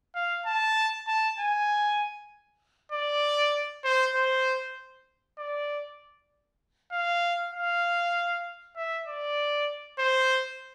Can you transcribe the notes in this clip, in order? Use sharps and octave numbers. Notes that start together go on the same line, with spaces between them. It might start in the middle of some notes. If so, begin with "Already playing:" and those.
F5
A5
A5
G#5
D5
C5
C5
D5
F5
F5
E5
D5
C5